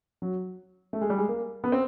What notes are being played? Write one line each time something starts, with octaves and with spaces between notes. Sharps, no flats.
F#3
A3
G#3
G3
G#3
A#3
B3
C4